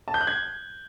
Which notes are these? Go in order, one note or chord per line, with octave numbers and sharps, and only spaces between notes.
A5
G6
F#6
G#6